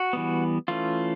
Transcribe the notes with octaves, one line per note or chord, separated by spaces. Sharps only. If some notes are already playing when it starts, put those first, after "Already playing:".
Already playing: F#4
E3 G3 B3
E3 A3 C#4 F4